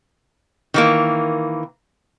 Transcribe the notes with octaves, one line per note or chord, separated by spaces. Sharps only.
D#3 E3 A#3